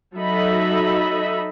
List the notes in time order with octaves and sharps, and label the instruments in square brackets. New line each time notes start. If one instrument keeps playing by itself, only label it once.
[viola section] F#3 D#4 A4 D#5 E5 B5